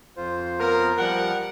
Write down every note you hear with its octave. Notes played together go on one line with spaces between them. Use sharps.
F2 F4 C5
B3 A#4
F3 G3 A#4 F#5